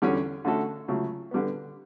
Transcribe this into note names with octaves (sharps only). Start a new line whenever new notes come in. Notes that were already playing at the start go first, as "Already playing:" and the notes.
E2 D3 G3 C#4 F#4
D3 A3 C#4 F#4 A4
C#2 C#3 F#3 A3
D3 G3 B3